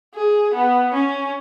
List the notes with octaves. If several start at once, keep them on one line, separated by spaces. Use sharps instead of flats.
G#4
B3
C#4